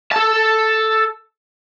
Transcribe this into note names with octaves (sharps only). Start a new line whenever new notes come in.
A4 A5